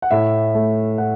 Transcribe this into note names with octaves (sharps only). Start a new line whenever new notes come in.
F#5
A2 E5
A3
A2 F#5